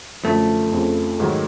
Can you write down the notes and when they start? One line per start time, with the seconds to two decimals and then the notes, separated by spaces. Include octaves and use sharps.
0.24 F#2 D3 F3 A3
0.72 F2 C#3 F3
1.20 G#2 D#3 F#3